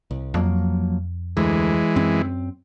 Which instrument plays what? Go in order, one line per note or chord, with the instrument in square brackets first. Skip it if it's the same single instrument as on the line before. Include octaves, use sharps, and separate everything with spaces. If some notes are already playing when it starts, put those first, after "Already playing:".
[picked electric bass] C2
[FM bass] F2 [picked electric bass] F3 F#3 A#3
[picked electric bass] D2 [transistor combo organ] E3 G#3
[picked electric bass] F#2 C4